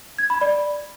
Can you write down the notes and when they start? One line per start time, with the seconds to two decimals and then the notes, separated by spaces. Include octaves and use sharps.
0.19 G#6
0.30 B5
0.41 D5